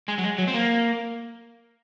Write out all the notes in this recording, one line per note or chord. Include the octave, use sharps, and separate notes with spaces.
G#3
F#3
G#3
F#3
C4
A#3